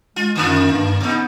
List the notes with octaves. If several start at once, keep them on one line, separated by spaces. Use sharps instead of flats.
G#3 F4
F#2 D3 A#3 F4
G2
C3 B3 D#4